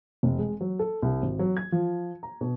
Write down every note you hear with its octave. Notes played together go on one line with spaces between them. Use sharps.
F1
G#3
F#3
A4
C2
G#1
F#3
G#6
F3
A#5
B2